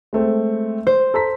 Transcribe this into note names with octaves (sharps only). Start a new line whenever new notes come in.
G#3 A3 C4
C5
A4 A#5 B6